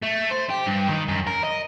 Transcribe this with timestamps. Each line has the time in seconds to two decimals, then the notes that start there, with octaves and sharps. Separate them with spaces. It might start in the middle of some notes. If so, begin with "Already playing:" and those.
0.03 A3
0.31 C5
0.50 G4
0.67 G2
0.89 D#3
1.09 F#2
1.27 A#4
1.44 D#5